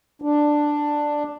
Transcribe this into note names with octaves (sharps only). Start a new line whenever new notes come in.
D4